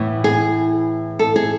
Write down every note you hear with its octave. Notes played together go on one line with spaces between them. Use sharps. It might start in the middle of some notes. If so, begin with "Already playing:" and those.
Already playing: A2 E3 B3
G#4
A4
G#4